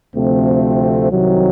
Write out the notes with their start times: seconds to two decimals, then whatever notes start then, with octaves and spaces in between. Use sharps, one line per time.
0.14 D2 C3 F3 A3 C4
1.11 C2 C3 D#3 F#3